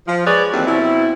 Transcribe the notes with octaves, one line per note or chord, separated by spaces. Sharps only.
F3
G#3 G#4 B4 C#5 D5
D#2 G#2 E3 F#3 C4
B2 C4 E4